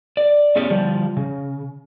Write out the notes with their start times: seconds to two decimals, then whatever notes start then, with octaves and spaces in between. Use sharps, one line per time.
0.17 D5
0.56 A3 B3 C#4 G4 D5
0.70 D3 F3 G3
1.17 C#3